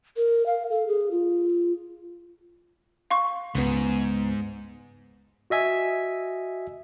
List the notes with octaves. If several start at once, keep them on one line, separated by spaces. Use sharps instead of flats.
A#4
F5
A4
G#4
F4
F5 C6 C#6
C#2 G#2 B3
F#4 D#5 E5 G#5